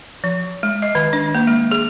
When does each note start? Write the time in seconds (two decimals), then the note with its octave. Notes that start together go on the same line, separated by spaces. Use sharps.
0.24 F3
0.63 G#3
0.82 D#5
0.95 D#3
1.13 D4
1.35 A#3
1.47 G#3
1.72 G#4